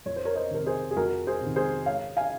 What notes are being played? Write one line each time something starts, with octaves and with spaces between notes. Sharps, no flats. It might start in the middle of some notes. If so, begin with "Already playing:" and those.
F2 C#5
C5
A#4 C#5
C5 D#5
C3 D#3 A#4
G#4 C5
G#4
F2 F#4 A#4
G#4 C5
C3
D#3
G#4 C5
G#2 C#5 F5
F5 G#5